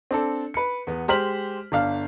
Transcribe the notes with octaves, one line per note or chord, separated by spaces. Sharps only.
C4 D4 A4
B4 C#7
E2 B3
G#3 G4 C5 F6 B6 F#7
G1 D4 F5